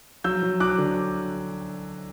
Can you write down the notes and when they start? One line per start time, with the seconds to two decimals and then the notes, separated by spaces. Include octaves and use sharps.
0.24 F#3 E6 G6
0.43 F#3
0.60 F#3 D6 F#6
0.78 D3